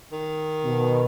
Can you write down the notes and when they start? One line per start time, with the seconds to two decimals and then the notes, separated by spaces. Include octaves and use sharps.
0.12 D#3
0.65 B2